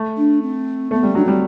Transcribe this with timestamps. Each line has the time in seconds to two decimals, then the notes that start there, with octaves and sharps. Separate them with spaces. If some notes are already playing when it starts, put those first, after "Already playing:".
Already playing: A3
0.17 D4
0.42 C4
0.91 A3 B3
1.03 G3 C4
1.15 F#3 D4
1.24 G3 C4